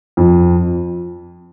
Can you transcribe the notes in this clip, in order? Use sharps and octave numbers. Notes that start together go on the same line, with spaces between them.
F2